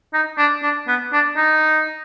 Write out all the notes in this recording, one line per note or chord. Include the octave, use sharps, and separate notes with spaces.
D#4
D4
D4
B3
D4
D#4